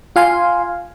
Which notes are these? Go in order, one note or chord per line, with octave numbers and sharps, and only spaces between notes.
F4 F5 G#5 C6